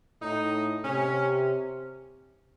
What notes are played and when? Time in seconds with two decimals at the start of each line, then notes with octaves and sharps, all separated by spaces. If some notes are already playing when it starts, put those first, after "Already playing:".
0.22 A2 D#4
0.84 C3 C#4